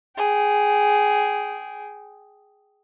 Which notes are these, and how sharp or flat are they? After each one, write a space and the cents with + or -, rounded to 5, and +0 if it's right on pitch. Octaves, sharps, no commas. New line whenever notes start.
G#4 +0 G5 -20